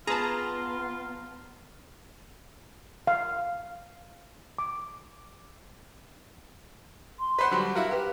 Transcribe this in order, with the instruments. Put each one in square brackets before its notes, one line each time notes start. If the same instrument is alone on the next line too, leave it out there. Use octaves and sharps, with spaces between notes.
[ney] B3 [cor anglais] F4 [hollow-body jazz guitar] G#4 B4 [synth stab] A5 A#5
[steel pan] F5
D6
[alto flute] C6
[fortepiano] B4 C5 F#5
D3 F#3 G3
[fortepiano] E4 F#4 A#4 [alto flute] F5
[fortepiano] G4 [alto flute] B4